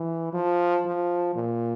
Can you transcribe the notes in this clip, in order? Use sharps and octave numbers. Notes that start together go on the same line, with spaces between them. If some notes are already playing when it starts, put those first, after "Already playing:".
Already playing: E3
F3
F3
A#2